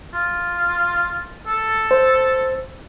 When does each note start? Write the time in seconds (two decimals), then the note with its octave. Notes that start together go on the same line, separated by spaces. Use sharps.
0.14 F4
1.47 A4
1.91 C5